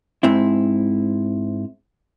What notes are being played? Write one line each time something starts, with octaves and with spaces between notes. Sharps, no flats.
G#2 C4 E4